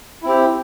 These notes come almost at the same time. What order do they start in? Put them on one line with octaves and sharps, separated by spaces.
E4 C4 G4